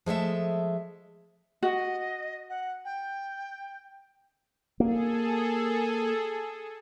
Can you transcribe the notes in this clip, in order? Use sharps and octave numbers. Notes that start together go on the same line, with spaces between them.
F3 G#3 A3 E5
F#4 D#5
F#5
G5
A#3 G#4 A4